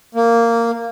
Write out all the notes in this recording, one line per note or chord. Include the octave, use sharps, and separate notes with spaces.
A#3